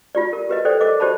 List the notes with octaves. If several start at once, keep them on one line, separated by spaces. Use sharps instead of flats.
F4 G4 D5
A#4
G4 B4 D#5
A4 C5 D5 G5
A#4 D#5 D6
G4 C5 D5 A5 B5